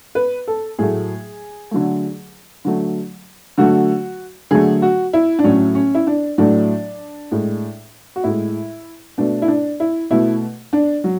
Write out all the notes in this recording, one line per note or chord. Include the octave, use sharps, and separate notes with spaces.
B4
A4
A2 F#3 A3 G#4
D3 F#3 A3
D3 F#3 A3
D3 F#3 A3 F#4
D3 F#3 A3 G#4
F#4
E4
D4
A2 F#3 A3 C#4
C#4
E4
D4
A2 F#3 A3 D4
A2 G#3
F#4
A2 G#3 E4
B2 A3 D4
E4
D4
E4
B2 A3 E4
D4
F#3